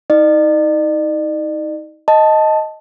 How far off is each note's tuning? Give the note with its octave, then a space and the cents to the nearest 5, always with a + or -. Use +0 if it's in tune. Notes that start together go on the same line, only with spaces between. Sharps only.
D#4 +30 D5 +45
D#5 +5 A5 +0